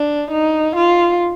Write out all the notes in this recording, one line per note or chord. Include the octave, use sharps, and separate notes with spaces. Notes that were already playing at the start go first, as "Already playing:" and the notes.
Already playing: D4
D#4
F4